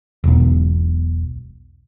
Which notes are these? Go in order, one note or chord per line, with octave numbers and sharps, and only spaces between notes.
E1 B1